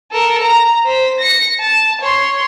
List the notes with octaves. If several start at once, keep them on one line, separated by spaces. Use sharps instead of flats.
A4 A#4
A#5
C5 B6
A#6 C#7
A5
C#5 C6